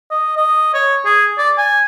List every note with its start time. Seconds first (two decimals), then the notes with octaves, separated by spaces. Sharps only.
0.11 D#5
0.37 D#5
0.74 C#5
1.05 G#4
1.38 D5
1.58 G#5